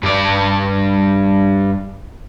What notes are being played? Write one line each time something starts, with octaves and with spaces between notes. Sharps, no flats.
G2 D5